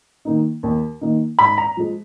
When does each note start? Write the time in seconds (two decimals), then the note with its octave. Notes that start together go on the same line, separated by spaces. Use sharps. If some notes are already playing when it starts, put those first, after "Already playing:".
0.25 D#3 A#3 D#4
0.63 D#2
1.01 D#3 A#3 D#4
1.39 G#2 B5
1.58 A#5
1.77 F3 G#3